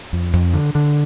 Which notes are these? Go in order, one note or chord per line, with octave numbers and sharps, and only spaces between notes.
F2
F2
D3
D3